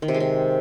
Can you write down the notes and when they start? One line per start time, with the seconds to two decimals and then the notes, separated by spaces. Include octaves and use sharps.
0.02 D#3
0.08 C3
0.14 G#3
0.20 C3